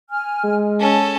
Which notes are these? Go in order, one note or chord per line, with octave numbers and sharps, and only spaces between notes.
G#5 F6
G#3
C#4 A4 A5